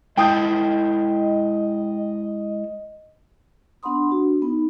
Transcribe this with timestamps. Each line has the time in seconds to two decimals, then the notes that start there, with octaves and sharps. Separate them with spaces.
0.17 G#3 E4 D#5 G5 A5 D#6 G6
3.83 B3 D4 F#5 B5 C6 D#6
4.10 D4 F#4
4.42 B3 D#4